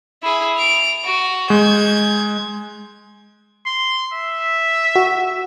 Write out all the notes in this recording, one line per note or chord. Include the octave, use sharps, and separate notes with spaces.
E4 G#4
D7 F7
F#4
G#3 G6 G#6
C6
E5
F#4